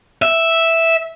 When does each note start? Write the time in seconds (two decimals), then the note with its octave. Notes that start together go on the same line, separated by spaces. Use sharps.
0.22 E5